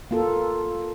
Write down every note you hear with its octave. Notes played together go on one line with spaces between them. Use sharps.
A#3 F4 A4